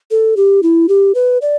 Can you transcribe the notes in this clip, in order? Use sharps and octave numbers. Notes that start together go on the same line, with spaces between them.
A4
G4
E4
G4
B4
D5